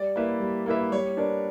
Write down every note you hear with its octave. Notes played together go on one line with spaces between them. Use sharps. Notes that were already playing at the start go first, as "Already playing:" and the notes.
Already playing: G3 D5
A#3 E4 B4 E5
G3
A#3 E4 B4 E5
G3 C#5
B3 D4 A#4 D5